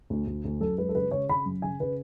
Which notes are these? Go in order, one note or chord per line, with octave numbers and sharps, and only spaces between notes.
D2
D2
D2
F#2 A4
G#3 B4
A4
C#3 B4
C#3 C#5
C#3 B5
F#2
C#3 G#5
C#3 B4